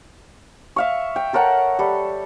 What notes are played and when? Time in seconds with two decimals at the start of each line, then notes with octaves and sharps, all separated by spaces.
0.76 E5 F5 C#6
1.16 G5
1.33 A4 A#4 C#5 F#5
1.79 G3 A4